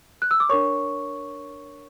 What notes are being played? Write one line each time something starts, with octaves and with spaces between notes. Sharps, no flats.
F#6
E6
D6
D4 A#4 C#5 C#6